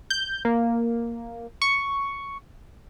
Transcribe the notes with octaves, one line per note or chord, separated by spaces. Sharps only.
G6
A#3
C#6